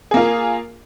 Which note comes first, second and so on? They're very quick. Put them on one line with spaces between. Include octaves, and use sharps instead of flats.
G#4 A#3 F4